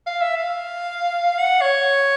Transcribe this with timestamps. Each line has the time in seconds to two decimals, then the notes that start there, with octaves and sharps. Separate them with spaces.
0.07 F5
0.21 E5
0.36 F5
1.39 F#5
1.61 C#5